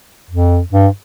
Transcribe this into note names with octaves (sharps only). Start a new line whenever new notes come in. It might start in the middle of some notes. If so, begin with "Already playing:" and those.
F2
G2